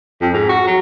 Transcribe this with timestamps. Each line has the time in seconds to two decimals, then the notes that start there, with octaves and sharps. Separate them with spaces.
0.21 F2
0.33 G#2
0.49 F#4
0.67 F#3